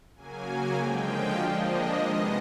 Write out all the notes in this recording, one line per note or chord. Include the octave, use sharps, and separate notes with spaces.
C#3 F#3 A#3 G#5
G#5
D3 F3 G#3 G5
F5
F3 A#3 D4 D#5
C3 D#3 G#3 B3